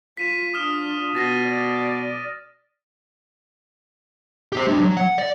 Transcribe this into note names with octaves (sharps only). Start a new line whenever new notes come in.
F4 B6 D#7 E7
D4 F4 D#6 F6 E7
B2 A6 A#6 D#7
D5
G4 C5
G#3 D4
F#3
F#5
D5